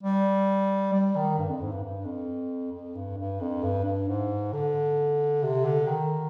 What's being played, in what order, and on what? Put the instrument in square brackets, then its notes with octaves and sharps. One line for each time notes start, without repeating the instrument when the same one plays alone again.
[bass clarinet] G3
G3
D#3
G2
F2
G#2
G2
G2
F2
F2
G2
G2
F2
G2
G2
G#2
D3
C3
D3
D#3